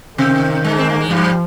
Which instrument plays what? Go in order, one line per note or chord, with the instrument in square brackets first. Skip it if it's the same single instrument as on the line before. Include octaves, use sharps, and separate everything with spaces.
[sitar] C3 C4 [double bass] D#3
[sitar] G#2 G#3
C4
A#3
G#3
[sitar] G2 G3 [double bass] F3